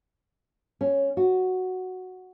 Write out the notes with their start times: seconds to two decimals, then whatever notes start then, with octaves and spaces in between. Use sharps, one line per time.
0.81 C#4
1.17 F#4